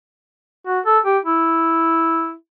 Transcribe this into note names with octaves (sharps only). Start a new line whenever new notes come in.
F#4
A4
G4
E4